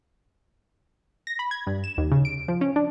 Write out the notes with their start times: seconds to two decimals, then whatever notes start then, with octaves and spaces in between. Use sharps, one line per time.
1.27 A#6
1.39 B5
1.51 G#6
1.67 G2
1.84 E7
1.98 D#2
2.12 C#3
2.25 D7
2.48 F3
2.61 C#4
2.76 D4